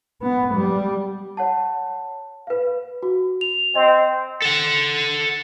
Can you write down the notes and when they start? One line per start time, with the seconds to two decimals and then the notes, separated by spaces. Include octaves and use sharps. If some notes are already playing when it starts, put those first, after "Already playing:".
0.22 B3
0.54 G3
1.37 C#5 F#5 A5
2.47 B4 F5
3.03 F#4
3.41 F7
3.75 C4 D#5
4.42 A4 F#5